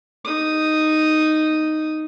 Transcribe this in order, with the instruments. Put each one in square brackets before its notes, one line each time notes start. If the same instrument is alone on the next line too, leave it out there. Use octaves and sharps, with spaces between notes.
[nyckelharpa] D#4 D#6